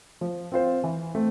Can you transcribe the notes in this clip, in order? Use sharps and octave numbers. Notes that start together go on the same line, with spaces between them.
F3
C4 F4 C5
E3
A3 C4